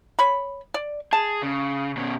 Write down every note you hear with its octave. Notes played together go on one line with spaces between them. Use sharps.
C#5 B5
D5
G#4 A5
C#3
B2 C#4